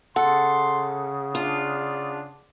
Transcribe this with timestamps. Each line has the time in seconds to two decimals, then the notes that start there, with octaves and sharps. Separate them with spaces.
0.16 C#3 A4 F#5 C6
1.35 D4 F4